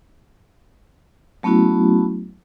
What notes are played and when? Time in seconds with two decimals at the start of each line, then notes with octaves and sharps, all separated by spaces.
1.43 F#3 A3 B3 C#4 E4 F#4